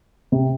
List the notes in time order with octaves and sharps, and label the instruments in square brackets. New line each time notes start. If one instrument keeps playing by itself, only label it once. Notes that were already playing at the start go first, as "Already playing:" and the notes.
[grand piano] C3